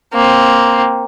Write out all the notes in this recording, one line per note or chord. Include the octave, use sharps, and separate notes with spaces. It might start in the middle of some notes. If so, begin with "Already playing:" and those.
A#3 C4